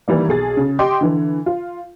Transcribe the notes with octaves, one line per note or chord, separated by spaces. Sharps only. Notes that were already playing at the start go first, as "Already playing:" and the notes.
D#3 E3 G3 A#3
B1 G#4 A6
C#3
G4 D#5 G5 C6 D6
D3 E3
F4